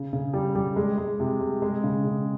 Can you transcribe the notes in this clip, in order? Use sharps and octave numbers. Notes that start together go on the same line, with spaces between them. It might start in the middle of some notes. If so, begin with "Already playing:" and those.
Already playing: C#3
C#3
G3
G3
G#3
G#3
C3
G#3
G#3
C#3
C#3